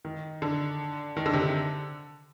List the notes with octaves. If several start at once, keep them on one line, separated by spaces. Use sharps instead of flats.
D#3
D3
D#3
D3
C3
D3